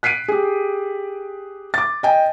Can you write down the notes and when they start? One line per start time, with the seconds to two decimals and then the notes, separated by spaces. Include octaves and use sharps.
0.03 F#6 B6 C7 D7 D#7
0.28 G4 G#4
1.74 D6 A6
2.03 D#5 G5 G#5